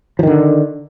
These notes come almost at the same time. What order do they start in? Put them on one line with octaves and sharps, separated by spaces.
F3 D#3 D3